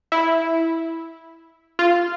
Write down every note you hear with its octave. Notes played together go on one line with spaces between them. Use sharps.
E4
F4